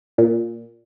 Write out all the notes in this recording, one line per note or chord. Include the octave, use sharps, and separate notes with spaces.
A#2